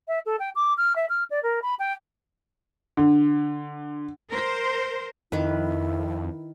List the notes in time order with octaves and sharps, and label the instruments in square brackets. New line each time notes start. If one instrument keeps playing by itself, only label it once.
[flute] E5
A4
G5
D6
F6
E5
F6
D5
A#4
B5
G5
[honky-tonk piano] D3
[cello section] A#4 C5
[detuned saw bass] F2 [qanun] D#3 B4 [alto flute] E4